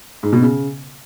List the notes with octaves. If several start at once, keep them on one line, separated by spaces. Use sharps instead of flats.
G#2
B2
C#3